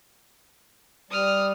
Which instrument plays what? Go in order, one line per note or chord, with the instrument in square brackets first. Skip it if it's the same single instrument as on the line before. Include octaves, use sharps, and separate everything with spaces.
[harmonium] G3 [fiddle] D#6 F6